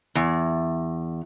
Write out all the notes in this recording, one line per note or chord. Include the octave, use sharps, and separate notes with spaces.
E2